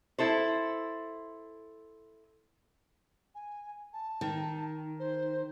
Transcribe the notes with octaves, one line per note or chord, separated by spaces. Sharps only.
E4 A4 C5
G#5
A5
D#3
C5